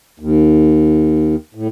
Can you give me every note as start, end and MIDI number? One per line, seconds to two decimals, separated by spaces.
0.20 1.35 39
1.55 1.68 45